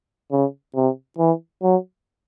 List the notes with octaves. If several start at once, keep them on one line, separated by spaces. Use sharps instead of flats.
C#3
C3
E3
F#3